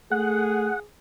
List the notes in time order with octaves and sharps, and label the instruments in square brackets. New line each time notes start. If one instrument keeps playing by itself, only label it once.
[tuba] A3 [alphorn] G#4 [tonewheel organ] F#5